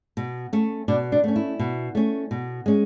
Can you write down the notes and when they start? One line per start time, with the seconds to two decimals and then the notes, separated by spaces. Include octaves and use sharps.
0.17 B2
0.53 A3 C#4
0.88 B2 D4
1.12 D4
1.24 A3 C#4
1.36 E4
1.59 B2
1.95 A3 C#4
2.31 B2
2.66 G#3 C#4